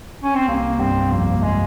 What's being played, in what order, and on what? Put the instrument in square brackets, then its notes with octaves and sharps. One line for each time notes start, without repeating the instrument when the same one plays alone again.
[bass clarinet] C#4
C4
[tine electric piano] C2 C3 [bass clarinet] A#3
[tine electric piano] G2 G3 [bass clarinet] C4
[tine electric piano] F2 F3 [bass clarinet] A#3
[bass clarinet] G#3